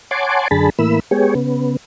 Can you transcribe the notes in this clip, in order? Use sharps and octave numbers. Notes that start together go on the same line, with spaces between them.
C#5 F#5 G#5 A5 C6 D6
F#2 D3 G#4 A5 B5
A2 E3 A#3 B5 E6
G#3 B3 G4 G#4 C#5
C#3 B3